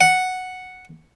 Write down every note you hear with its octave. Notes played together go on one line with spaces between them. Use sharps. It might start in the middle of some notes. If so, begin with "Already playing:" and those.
F#5